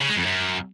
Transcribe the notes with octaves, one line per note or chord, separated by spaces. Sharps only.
C#3
G#3
F2
F#2